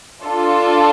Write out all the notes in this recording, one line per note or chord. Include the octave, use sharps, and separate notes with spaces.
D4 F4 A4